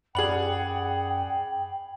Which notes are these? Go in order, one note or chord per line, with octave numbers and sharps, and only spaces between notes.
F#2 G#4 D5 F#5 G5 B5 F#7